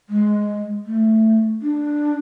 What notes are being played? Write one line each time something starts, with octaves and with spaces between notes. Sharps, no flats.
G#3
A3
D4